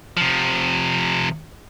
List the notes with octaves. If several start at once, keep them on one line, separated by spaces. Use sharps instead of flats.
C3 F3